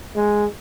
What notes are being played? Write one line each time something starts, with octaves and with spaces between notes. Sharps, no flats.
G#3